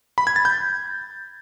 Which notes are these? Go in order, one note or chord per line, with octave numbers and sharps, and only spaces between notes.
B5
G#6
A6
G6